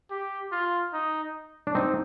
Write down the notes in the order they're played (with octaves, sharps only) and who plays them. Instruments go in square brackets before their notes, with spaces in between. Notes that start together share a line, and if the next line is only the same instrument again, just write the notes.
[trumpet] G4
F4
D#4
[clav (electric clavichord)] D4
C4 D#4